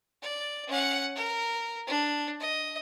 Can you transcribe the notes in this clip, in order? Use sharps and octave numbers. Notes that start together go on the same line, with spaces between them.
D5
C#4 F#5
A#4
D4
D#5